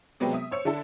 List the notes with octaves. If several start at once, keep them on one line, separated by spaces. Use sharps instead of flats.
C3 F#3 G#3 B3 C4
E5 D#6
C5 C#5 E6 C#7
D3 D4 E4 A4